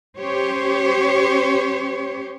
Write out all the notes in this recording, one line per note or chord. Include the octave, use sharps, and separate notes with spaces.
C#4 G4 C5 C#5